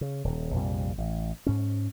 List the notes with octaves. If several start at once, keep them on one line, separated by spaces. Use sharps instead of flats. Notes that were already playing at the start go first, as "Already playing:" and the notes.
C#3
D#1
A#1 F2 C3 G3
A1
G#2 C#4